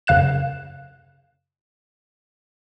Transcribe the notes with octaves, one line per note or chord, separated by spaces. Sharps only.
F#2 C#3 F5 F#6 E7